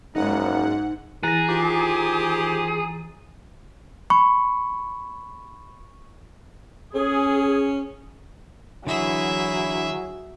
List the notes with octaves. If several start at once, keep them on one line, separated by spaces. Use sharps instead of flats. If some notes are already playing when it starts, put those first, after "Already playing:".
F#1 G#2 D#4 F#5
E3 G#4 A#5 F#6 A6 A#6
D#3 F4 G4 C5 D6
B5 C#6
C#4 G#4
D3 E3 F#3 E4 G#4 E5